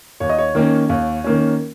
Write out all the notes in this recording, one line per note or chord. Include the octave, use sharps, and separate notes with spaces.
D#2 C#5
D#5
C#5
D#3 A#3 C#4
D#2
D#3 A#3 C#4